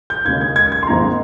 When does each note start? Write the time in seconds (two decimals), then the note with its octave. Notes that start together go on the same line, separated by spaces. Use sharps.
0.10 G6
0.25 D#2 C#3 G#3 G#6
0.41 G#6
0.56 G#6
0.72 G#6
0.83 C6
0.87 G#1 G#2 D#3 A#3 A#5